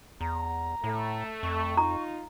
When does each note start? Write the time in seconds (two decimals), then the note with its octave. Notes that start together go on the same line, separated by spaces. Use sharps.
0.21 E2 A#5
0.84 A2 A3
1.43 F2 C#6
1.77 D#4 F4 A#5